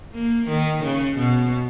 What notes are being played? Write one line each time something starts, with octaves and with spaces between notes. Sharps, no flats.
A#3
D#3
C#3
B2